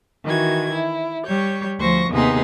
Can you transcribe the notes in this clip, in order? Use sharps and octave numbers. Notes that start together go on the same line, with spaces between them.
D#3 E3 F#4 G#6
E4
G3 C#5 G6
D2 F3 C5 C#6 A#6
D#2 C3 B3 D#4 G#4 C6